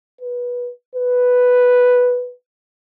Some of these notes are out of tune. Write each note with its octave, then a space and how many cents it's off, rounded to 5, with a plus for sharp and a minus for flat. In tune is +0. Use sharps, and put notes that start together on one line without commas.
B4 -20
B4 +0